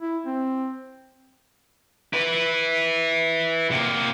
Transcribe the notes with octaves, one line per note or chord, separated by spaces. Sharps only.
E4
C4
E4 B4
C3 A#3